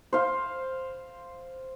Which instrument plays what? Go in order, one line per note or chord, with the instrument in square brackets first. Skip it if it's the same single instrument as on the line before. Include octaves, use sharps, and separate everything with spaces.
[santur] C5 F5